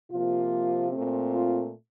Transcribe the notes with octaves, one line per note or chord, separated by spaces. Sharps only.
C3 F3 A#3 F4
A#2 A3 C4
F4